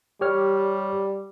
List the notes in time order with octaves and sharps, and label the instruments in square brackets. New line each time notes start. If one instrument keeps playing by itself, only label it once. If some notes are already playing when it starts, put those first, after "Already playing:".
[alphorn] G3 [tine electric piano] G4 C#5 F6